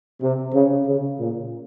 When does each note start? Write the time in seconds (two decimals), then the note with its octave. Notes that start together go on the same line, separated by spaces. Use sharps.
0.22 C3
0.53 C#3
0.86 C#3
1.18 A#2